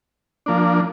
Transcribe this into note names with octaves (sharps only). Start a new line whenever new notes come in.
F3 A#3 D4